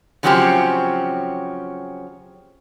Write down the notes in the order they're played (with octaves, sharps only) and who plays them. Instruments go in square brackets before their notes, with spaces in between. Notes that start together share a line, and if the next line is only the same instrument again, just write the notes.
[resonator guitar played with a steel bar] C#3 F3 F#3 C4 C#4 G4